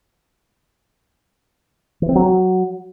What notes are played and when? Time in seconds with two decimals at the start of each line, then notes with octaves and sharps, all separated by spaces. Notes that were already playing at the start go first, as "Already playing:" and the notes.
2.02 E3
2.09 C4
2.16 F#3